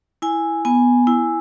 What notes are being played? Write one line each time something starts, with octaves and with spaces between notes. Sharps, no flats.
E4 G#5
B3 G#5
E4